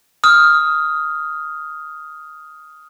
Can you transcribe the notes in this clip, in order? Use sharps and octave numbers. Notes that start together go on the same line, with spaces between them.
D#6 F6